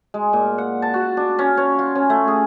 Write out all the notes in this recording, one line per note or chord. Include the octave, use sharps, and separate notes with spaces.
G#3
A#2
F#5
A5
F#4
D4
C#4
C#5
F4
C#4
A3
G#4